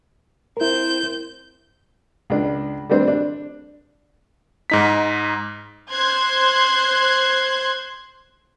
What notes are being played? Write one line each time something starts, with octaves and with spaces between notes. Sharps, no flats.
C4 E4 A#4 G6
C#2 D4
G3 A3 C4 D4 C5
D4
G#2 D#4 B6
C5 C6 F#6 G#6